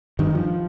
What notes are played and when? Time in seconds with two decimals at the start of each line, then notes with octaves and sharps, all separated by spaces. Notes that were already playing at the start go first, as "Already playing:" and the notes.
0.19 G2 D#3
0.35 F3